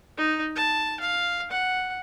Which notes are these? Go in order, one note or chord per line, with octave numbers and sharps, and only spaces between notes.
D#4
A5
F5
F#5